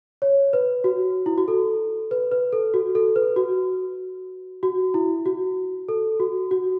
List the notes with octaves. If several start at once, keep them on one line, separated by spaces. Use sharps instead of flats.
C#5
B4
F#4
E4
F#4
A4
B4
B4
A4
F#4
A4
B4
F#4
F#4
E4
F#4
A4
F#4
F#4